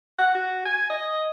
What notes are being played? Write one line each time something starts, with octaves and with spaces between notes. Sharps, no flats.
F#5
F#4
G#5
D#5